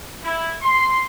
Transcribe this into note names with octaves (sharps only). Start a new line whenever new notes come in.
E4
C6